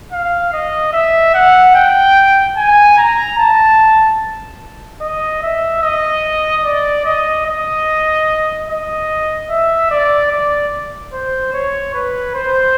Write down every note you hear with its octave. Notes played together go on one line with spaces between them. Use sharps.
F5
D#5
E5
F#5
G5
G#5
A#5
A5
D#5
E5
D#5
D5
D#5
D#5
D#5
E5
D5
D5
C5
C#5
B4
C5